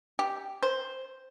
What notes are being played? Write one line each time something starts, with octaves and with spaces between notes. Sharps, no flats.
G4
C5